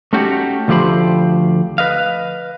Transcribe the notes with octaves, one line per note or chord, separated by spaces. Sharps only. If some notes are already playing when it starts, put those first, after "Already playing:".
A3 C#4 D#4 F#4 G4 A4
D2 F3 A3 G4 C5 B5
B4 D#5 F5